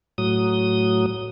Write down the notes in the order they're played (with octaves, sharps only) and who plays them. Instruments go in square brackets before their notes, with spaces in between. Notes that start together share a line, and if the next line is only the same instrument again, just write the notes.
[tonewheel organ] A2 F#3 D#6